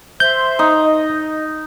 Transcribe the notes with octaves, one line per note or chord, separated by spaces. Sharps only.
C5 E5 C6 G6
D#4
D#5